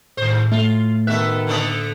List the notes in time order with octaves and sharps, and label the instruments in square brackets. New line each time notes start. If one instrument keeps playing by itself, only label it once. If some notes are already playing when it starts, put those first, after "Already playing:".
[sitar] D#2 C5 [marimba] A2
[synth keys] A3 [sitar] F4
[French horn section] B2 D#3 B3 [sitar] A3 E5 [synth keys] F#6
[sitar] D3 A3 A#3